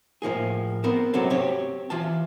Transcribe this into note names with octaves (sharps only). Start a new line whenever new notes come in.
A2 F3 A#3 G#4
B3 C4 A#4 C5
C3 F#3 C4 C#4 A4
C4 G4 C#5
E3 F4 A5